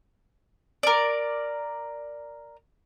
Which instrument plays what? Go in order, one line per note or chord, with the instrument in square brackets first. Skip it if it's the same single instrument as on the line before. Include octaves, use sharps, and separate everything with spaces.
[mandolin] A#4 D5